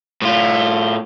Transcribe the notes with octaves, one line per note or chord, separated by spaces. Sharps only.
A2 F4